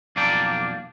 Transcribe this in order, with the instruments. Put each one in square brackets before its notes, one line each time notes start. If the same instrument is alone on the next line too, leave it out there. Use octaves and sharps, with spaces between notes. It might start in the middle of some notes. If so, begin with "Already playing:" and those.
[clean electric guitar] B1 F2 A#3 D4 D5 G5